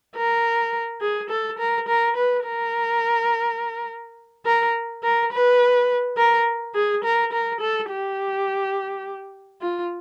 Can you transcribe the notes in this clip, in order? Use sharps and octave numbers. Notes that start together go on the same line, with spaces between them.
A#4
G#4
A4
A#4
A#4
B4
A#4
A#4
A#4
B4
A#4
G#4
A#4
A#4
A4
G4
F4